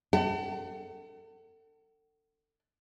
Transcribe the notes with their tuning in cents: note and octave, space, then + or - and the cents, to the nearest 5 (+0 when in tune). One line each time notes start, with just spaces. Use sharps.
A4 +35 F#5 +45